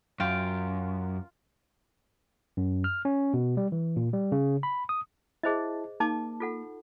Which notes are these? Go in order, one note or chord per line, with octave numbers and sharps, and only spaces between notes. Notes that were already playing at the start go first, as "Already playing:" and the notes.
F#2 F4 G5
F#2
F6
C#4
B2
G3
E3
A#2
G3
C#3
B5
D#6
E4 G#4 C5 D#5 A5
A#3 D#4 A5 D6
F4 A4 F#5